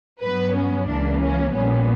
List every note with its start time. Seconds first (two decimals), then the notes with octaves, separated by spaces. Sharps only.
0.23 G2 F#3 B3 B4
0.56 C#4
0.88 C#2 C#3 E3 A#3 D4
1.21 C#4
1.54 A#1 A#2 G3 B3 C#4